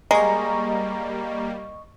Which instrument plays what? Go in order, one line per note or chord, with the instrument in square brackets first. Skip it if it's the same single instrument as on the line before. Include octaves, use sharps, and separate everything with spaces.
[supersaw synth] G3 A#3 [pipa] G#3 [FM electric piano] D#5 C#6 [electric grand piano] A#5